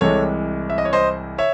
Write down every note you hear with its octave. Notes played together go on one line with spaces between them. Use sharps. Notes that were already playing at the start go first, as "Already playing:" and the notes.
C2 C3 E3 G#3 A4 C#5
E5
D#5
C#5
C5 D#5
C#5 E5